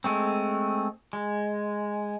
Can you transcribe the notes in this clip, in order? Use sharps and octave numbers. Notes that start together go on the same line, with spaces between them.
G#3 A3 C4
G#3